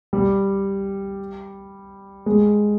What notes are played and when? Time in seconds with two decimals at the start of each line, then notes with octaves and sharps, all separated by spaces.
0.13 G3
2.26 G#3